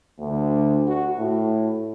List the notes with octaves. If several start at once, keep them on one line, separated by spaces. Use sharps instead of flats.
D2
F#4
A2